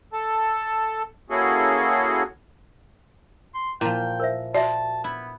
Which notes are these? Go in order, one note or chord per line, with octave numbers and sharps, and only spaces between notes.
A4 A5
A#3 C#4 E4 F#4 G#4 A4
C6
A#2 F3 E4 G5
A#4 C5 E5
F#4 D5 E5 A5
B3 E4